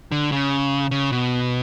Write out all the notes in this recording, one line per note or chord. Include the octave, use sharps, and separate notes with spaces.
D3
C#3
C#3
B2